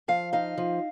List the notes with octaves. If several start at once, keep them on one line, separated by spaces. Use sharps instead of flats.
F3 F5
D#4 F5
F3